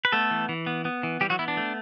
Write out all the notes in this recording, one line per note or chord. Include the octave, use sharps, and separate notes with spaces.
B4
A3 B3 A4
E3
E3
B3
B3
E3
E3 G3 G4
F#3 F#4
B3 E4
D4
A3